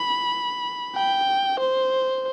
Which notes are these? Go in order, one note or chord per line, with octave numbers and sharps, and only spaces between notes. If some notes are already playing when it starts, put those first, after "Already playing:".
Already playing: B5
G5
C5